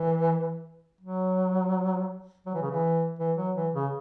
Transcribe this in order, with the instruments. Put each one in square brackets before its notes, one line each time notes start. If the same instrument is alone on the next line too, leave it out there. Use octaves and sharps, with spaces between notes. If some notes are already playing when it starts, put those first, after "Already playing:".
Already playing: [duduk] E3
F#3
F#3
E3
C#3
E3
E3
F#3
E3
C#3